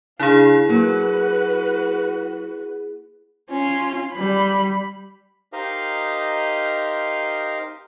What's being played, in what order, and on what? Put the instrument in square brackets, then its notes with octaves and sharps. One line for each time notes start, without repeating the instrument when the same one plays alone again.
[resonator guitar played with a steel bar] C#3 D4 [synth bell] E4 G#4 [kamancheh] F5
[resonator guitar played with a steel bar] F#3 [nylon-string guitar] A#3 [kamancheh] F#4 B4
[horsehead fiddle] C#4 F4
G3 B5
[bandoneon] D#4 G4 A#4 C5 D#5 F5